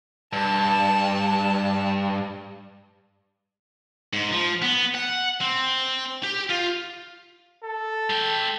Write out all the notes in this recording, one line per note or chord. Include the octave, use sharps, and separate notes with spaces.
G2 A5
G#2
F3
B3
F#5
C4
G4
F4
A4
G#3 G5